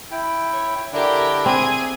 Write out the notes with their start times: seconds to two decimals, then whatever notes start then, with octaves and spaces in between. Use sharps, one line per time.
0.11 E4 G5
0.51 C#5
0.93 D3 D4 E4 G4 A#4
1.46 C4 G#4